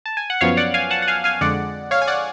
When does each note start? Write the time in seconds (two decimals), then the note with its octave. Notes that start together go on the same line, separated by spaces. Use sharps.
0.06 A5
0.17 G#5
0.30 F#5
0.41 F#2 F3 B3 C#5 F5
0.57 D5 F#5
0.74 F5 G#5
0.91 F#5 A5
1.02 F#5
1.08 F5 G#5
1.24 F5 G#5
1.41 F2 D3 G#3 D5 F#5
1.91 C#5 F5
2.02 G#5
2.08 D5 F#5